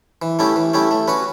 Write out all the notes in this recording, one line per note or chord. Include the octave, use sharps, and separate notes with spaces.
E3
A3 C#4 E4 G4
E3
A3 C#4 E4 G4
A3
C#4 F#4 B4